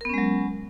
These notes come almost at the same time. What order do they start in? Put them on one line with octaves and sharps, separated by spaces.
A#4 B3 C#4 G#3 F#3